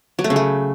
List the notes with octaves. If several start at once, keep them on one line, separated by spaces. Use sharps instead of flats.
F#3
A3
C#3
A3